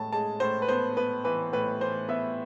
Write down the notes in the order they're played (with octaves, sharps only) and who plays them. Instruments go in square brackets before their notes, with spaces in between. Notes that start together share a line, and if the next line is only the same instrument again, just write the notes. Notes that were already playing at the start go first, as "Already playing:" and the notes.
Already playing: [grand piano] A2 G#3 A5
G#3 A5
A2 C5
B4
B3 C5
B3 B4
E3 B4
A2 B4
E3 C5
B3 E5